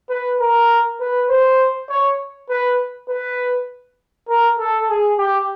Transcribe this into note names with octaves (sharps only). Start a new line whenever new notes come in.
B4
A#4
B4
C5
C#5
B4
B4
A#4
A4
G#4
G4